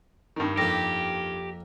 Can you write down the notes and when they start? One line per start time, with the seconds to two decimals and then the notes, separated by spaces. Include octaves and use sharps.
0.36 G2 D#3
0.58 F2 A#3 G4 A#6